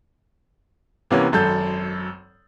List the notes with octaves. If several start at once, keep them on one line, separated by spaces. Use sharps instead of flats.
C3 E3 A#3 B3 C#4
G#1 F#2 A4 G6